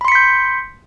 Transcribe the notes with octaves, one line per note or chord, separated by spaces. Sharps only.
B5 C6 G6 B6 C#7